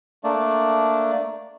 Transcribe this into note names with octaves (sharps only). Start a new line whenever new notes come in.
A3 A#3 D4 D5